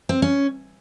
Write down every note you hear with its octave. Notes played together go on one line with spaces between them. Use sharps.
C4
C#4